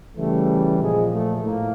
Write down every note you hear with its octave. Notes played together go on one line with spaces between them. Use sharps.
C#3 E3 G3 A3
A#2 F3 G#3
A3
A2 A#3